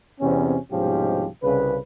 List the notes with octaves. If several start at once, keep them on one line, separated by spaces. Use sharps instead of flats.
E2 C3 C4 C#4
C2 G#2 B2 F3 C#4 G4
C2 C#3 B4